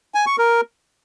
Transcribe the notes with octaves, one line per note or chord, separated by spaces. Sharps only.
G#5
C#6
A#4